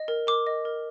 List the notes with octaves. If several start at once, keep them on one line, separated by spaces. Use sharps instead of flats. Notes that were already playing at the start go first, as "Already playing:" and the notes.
Already playing: D#5
A#4
A#4 D6
D#5
A#4